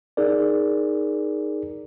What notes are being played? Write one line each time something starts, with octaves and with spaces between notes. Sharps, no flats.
D#4 G#4 A#4 D5